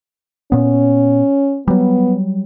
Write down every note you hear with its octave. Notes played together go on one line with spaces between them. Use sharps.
A#2 B3 C#4
F#3 G3 B3